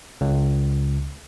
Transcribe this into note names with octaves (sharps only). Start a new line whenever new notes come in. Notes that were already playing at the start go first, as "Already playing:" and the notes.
C#2